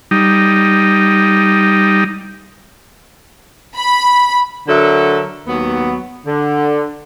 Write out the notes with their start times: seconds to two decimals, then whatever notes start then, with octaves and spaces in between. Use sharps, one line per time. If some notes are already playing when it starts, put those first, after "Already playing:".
0.11 G3 D#4
3.77 B5
4.68 D3 F#3 A4 A#4 E5
5.47 D#2 F#3 B3
6.26 D3